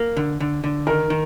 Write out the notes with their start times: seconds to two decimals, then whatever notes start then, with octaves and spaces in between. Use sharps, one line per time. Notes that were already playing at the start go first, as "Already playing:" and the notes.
Already playing: A#3
0.17 D3
0.40 D3
0.64 D3
0.87 D#3 A#4
1.10 D#3